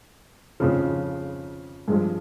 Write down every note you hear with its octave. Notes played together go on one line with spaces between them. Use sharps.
F2 C#3 F3
G2 F3 G#3